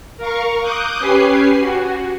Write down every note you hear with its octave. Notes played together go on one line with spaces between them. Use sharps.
A#4 F5 C#6
D6 D#6 F#6 G6
C#4 G4 B4 G#5 C7
F#4